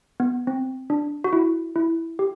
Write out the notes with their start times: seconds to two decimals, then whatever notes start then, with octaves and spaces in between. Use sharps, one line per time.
0.20 B3
0.47 C4
0.90 D4
1.24 F#4
1.33 E4
1.76 E4
2.19 G4